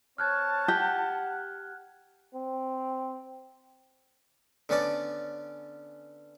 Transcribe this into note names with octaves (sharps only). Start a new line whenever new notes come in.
C4 C#5 A5 F6 F#6 G#6
G4 F#5
C4
D3 B3 C#4 D5 A5